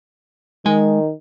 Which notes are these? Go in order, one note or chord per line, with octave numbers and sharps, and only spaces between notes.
D#3 G#3 G#5